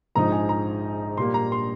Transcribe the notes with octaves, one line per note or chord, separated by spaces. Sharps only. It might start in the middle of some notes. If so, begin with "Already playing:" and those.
A#1 G#2 F3 G#3 D#4 A#5
G#5
A#5
A#2 G3 A#3 C6
A#5
C6